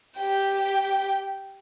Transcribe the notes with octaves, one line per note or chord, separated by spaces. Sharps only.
G4 G5